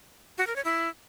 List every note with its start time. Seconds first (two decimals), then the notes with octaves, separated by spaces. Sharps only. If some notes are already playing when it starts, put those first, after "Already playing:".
0.38 F#4
0.47 A#4
0.56 C#5
0.65 E4